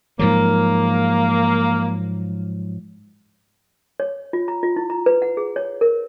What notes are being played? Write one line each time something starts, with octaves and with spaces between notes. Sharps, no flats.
G#2 F3 F#3 A#3
C#5
F4
A#5
F4
E4
A#5
B4
F#5
G#4
C#5
A#4